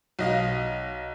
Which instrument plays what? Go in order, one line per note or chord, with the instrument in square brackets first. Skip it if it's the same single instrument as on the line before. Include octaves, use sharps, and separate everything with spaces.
[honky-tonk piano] B1 D#5 F5